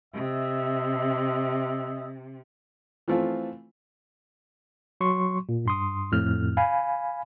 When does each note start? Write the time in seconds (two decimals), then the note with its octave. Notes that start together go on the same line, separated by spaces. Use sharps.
0.14 C3 D#5 E5
3.08 E3 F3 A3 C4 F4
5.01 F#3 C6 C#6
5.49 A#2
5.66 G2 C6 D#6
6.12 F2 A2 F6
6.57 F5 G#5 B5